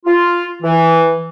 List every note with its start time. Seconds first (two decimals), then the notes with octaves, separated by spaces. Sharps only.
0.06 F4
0.63 E3